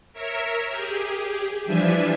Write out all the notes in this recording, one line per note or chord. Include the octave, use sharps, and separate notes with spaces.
A#4 C#5 E5
G4 G#4
E3 F3 G3 D4 E5 G#5